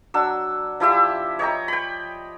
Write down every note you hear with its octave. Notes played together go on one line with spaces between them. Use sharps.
F#3 D4 E6
F3 E4 G4 E5
C#5 D#5 G5 A#5
G5 B5